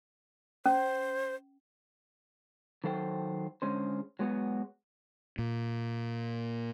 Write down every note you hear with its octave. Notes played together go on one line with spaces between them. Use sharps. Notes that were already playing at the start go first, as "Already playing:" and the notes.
C#4 C5
D#3 F#3 A4 C5 G5
D3 G#3 C#4 C5
F#3 G#3 B3 F#4
A#2